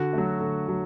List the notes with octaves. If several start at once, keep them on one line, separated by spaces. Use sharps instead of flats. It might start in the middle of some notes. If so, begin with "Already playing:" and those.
Already playing: D3 F#4
F#3 A3
D3
F#3